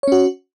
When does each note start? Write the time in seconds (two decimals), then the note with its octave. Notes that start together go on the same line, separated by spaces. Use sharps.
0.03 C#5
0.08 C#4
0.12 F#4